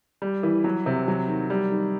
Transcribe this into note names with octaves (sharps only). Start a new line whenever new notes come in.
G3
E3
F#3
C3
F#3
D#3
G3
D#3